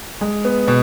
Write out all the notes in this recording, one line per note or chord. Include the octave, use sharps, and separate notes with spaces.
G#3
B3
B2